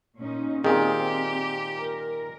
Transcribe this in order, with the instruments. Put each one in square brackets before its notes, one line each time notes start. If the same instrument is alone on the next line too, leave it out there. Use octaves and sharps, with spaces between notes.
[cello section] A#2 C#4 D#4
[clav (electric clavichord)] A#2 D#3 [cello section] C4 [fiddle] G4 [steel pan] G#4 D#6
[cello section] A#4